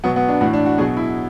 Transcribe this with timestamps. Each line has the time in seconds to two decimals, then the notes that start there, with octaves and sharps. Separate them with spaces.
0.04 B2 F#3 B3
0.16 B3
0.28 D4
0.41 A2 E3 F#4
0.53 D4
0.66 F#4
0.78 B2 F#3 G#4
0.97 E4